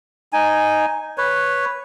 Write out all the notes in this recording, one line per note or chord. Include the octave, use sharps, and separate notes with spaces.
D#4 G#5
B4 C#5